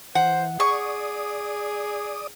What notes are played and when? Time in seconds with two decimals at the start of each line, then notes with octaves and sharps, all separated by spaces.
0.15 E3 C5 F#5
0.60 G#4 D5 C#6 D#6